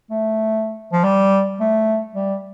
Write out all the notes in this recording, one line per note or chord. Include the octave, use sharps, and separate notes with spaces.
A3
F3
G3
A3
G3